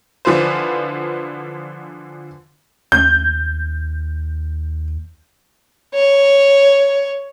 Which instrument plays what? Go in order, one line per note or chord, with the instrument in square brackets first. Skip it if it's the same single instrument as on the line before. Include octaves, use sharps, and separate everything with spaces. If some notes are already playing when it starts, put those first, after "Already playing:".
[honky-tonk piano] D3 E3 F3 F4 B4 C5
[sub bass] D#2 [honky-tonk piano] G6
[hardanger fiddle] C#5